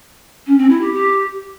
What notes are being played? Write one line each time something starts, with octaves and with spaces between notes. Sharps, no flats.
C#4
C4
E4
G4
G4